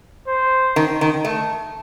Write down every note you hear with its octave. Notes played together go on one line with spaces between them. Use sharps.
C5
D#3
D#3
A3